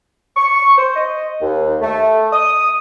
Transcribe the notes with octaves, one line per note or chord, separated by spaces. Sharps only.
C#6
C5
D#5
D#2
A3
D#6